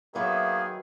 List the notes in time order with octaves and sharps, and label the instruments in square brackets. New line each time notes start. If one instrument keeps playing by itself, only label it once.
[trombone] D#3 [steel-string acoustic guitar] F#3 B4 E5 [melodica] A#3 B3 [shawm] G#4